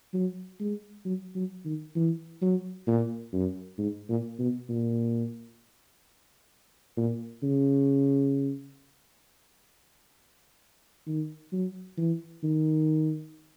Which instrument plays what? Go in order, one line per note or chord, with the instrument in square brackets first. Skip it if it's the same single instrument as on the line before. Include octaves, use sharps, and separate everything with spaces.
[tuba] F#3
G#3
F#3
F#3
D#3
E3
F#3
A#2
F#2
G#2
A#2
B2
A#2
A#2
C#3
D#3
F#3
E3
D#3